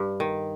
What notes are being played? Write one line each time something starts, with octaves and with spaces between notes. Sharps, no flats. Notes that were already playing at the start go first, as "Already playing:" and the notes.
Already playing: G2
D#3